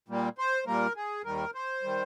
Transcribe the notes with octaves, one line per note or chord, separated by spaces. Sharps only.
A#2 G3 A#3
C5
A#2 G3 A#3 A#4
G#4
D#2 D#3 G3 A#4
C5
D#3 G3